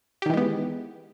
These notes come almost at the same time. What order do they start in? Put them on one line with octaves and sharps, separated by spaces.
G4 D#3 E3 G#3 B3